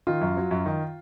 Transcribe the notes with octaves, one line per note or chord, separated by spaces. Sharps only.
D#3 F4
F#2
F#3
F#2
D#3